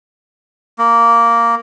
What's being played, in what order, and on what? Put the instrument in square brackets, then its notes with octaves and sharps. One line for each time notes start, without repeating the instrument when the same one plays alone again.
[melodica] A#3